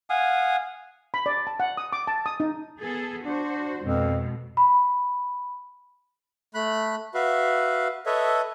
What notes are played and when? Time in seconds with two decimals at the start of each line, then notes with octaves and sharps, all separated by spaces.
0.10 F5 F#5 G#5 D#6
1.14 B5
1.26 D5
1.47 A5
1.60 F#5
1.77 D#6
1.93 D6
2.07 A5
2.26 D#6
2.40 D#4
2.81 B3 G#4 A4
3.24 D4 F#4 C5
3.82 F2 B2 G#3
4.57 B5
6.54 A3 B5 F#6
7.14 F#4 B4 E5 F5
8.06 A4 B4 C#5 D#5 E5